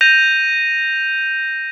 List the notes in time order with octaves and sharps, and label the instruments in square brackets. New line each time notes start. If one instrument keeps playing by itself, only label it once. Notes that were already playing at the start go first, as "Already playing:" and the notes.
[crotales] G6 A#6 D#7 F7